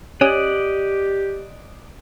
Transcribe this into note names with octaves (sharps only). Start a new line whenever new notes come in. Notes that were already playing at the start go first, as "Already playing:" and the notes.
C#4 G4 D5 D#5 F#5